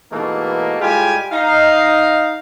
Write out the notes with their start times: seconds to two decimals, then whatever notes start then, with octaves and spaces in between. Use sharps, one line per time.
0.12 G#2 B2 E3 A3 A#3
0.81 A2 G3 G#3 F4 G4 G#5
1.32 D#4 F5